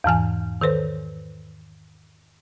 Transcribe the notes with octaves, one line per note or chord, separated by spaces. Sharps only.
E2 G#2 E3 G#5
D#3 A4 B4 C5